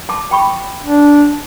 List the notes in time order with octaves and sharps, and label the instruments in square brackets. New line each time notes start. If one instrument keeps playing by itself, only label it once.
[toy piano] A5 D6
G5 B5 C#6
[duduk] D4